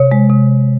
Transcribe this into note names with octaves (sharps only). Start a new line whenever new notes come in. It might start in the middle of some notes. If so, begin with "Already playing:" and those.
Already playing: C3 C#5
G#3
C3